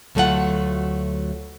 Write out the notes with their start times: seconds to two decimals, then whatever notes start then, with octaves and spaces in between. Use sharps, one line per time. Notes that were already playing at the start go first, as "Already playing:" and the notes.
0.15 D2 F#3 A3 C4 F4 F#5